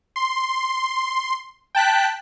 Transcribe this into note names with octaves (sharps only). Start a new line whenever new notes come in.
C6
G5 A5 F#6 B6